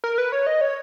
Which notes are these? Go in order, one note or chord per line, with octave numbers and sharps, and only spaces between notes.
A#4
B4
C#5
D#5
C#5